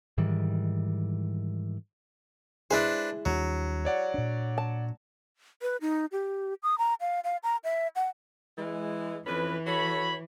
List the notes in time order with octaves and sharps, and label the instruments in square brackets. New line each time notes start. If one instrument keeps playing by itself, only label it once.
[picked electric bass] G#2 D#3 E3 G3
[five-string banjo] G#3 E4 G#4 [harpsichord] D4 B4 C5
[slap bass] D#2 G3 D4 [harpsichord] F#3
[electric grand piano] C#5 D5 F#5
[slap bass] A#2 D4
[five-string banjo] A5
[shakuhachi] B4
D#4
G4
D#6
A#5
F5
F5
A#5
E5
F#5
[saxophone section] E3 G#3
[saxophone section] F2 C#4 B4 [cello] E3
[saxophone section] F#4 A4 C#5 [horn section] B5